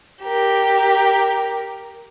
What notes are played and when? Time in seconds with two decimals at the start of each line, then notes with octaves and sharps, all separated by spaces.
0.23 G4 A#4